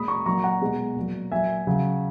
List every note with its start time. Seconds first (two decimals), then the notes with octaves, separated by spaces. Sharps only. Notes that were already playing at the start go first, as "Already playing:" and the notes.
Already playing: A#2 G#3 B5 D#6
0.08 A#5 C#6
0.26 A#2 F#3 A#5 C#6
0.43 F#5 A#5
0.62 B2 G#3
0.96 A#2 F#3
1.32 A#2 F#3 E5 G#5
1.67 C#3 F#3